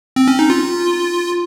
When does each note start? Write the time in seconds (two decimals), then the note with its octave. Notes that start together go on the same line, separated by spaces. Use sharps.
0.16 C4
0.28 C#4
0.39 D#4
0.50 F4